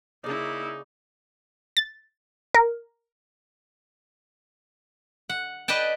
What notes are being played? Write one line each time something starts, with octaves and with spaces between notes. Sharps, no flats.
C#3 A#3 D#4 E4 D5
A6
A#4
F#5
B4 D5 D#5 G5 A5